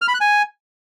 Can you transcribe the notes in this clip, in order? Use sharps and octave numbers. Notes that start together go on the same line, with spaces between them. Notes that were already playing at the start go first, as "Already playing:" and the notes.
F6
B5
F#6
G#5